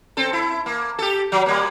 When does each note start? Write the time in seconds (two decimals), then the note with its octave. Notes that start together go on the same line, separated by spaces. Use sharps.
0.17 C4 A4
0.33 E4
0.66 A#3
0.99 G4 A4
1.32 F#3
1.46 G3 A#3